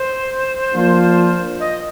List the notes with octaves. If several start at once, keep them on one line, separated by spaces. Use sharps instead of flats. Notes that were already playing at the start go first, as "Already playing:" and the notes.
Already playing: C5
F3 A#3 D4 F4
D#5